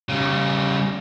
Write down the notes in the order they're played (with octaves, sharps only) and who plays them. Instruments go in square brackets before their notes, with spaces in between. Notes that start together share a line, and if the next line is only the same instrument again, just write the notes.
[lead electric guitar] C#3 G3